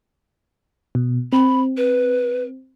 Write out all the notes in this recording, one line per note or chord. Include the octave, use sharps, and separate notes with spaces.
B2
C4 B5
B4